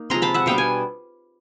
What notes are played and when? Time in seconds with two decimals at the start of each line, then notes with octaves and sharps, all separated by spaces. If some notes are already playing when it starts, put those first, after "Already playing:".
Already playing: A#3 D#4
0.10 C3 F3 G#3 A#5 C6
0.22 A5 B5
0.34 E5 F#5
0.46 B2 G3 B3 D4 F5 G5
0.58 G#5